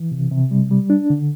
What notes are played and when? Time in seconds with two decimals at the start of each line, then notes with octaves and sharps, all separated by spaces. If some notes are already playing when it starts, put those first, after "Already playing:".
Already playing: E3
0.11 C3
0.31 C3
0.51 G3
0.71 G3
0.90 D4
1.10 D3